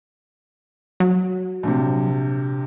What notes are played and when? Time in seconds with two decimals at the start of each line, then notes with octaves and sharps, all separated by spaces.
1.00 F#3
1.63 A#1 C3